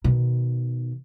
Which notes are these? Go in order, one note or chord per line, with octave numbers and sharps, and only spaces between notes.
B2 D#3